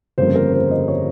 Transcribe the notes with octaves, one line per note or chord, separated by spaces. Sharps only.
G1 F2 C#3 G3 A#3 C5
A#4
C5
D#5
C#5